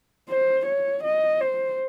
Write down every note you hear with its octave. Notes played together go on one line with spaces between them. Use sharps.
C5
C#5
D#5
C5